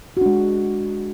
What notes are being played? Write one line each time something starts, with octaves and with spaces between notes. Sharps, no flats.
G#3 D4 F#4